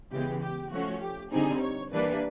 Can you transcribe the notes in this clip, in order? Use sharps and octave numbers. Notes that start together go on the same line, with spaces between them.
C#3 E3 G#3 B3 G4
G4
F3 A3 C#4 F#4
G4
D3 G3 C4 D#4 G#4
C#5
E3 G3 A#3 D4 B4